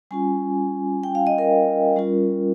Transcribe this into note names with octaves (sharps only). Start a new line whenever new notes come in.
G3 C#4 F4 G#5
G5
F5
D#5
A#4
G3 C#4 F4